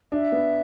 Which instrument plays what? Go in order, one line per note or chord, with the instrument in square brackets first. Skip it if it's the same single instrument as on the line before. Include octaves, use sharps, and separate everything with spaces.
[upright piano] D4 [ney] E5
[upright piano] B3